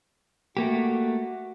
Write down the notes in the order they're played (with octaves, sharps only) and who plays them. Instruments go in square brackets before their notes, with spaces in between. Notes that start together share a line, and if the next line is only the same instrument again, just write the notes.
[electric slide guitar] A3 A#3 G4 [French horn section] F#4